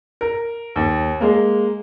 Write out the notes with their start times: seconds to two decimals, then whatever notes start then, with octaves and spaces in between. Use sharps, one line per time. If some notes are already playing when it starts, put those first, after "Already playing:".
0.21 A#4
0.76 D#2
1.21 G#3 A#3